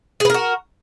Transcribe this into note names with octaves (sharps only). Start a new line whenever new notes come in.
F#4 G#4 A#4 B4